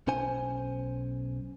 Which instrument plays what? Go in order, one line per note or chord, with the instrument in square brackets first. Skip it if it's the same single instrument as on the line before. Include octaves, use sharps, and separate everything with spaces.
[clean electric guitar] B1 C#4 C5 G#5